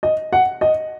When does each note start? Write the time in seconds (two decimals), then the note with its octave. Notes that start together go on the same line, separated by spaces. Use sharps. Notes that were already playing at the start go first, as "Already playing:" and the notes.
0.03 D#5
0.33 F#5
0.61 D#5